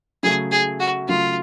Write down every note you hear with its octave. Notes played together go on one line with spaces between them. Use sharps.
C#3 F#3 A3 G#4
G#4
F#4
C#3 F#3 A3 F4